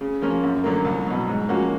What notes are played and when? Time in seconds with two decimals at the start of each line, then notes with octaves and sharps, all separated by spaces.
0.01 C#3
0.22 F3 A#3 C#4 F4
0.43 F#2
0.64 D3 F#3 A#3
0.85 C2
1.07 B2 F#3
1.28 G#2
1.49 F3 A#3 C#4 F#4